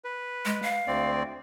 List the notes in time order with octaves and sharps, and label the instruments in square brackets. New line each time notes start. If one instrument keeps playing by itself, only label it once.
[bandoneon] B4
[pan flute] G#3
F5
[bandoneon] D2 C4 D5